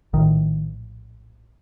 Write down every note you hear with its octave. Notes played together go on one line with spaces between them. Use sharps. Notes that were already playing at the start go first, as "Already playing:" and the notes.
A#1 A2 D#3